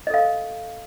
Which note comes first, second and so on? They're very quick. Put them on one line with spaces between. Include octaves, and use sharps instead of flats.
D#5 A4 F5